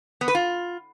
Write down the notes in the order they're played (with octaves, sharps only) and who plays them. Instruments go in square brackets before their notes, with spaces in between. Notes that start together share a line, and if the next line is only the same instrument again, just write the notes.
[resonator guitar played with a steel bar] B3
B4
F4